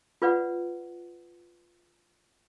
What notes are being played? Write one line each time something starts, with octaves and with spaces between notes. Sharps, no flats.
F4 B4 D5 F#5